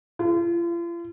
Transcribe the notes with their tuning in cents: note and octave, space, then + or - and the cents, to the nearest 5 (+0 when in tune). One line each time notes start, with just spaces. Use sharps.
F4 -40